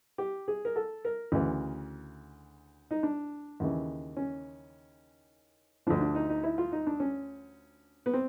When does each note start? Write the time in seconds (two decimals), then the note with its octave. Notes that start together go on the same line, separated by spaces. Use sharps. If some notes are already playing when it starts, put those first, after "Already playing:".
0.18 G4
0.48 G#4
0.65 A#4
0.76 A4
1.05 A#4
1.32 D2 C#3 E3
2.91 D#4
3.03 D4
3.60 D#2 C#3 E3
4.17 C#4
5.87 D2 D3 F3 D4
6.01 D4
6.15 D#4
6.29 D#4
6.44 E4
6.58 F4
6.72 D#4
6.87 D4
7.00 C#4
8.06 B3
8.13 C4